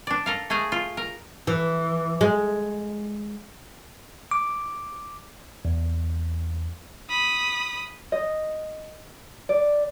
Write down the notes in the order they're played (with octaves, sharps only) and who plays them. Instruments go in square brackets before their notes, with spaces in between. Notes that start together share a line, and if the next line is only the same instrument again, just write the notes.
[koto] D4 D5
A4 A#4 F5
A3 G#4 A#4 G#5
F4
A#4
[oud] E3
G#3
[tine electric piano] D6
E2
[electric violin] B5 D#6
[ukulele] D#5
D5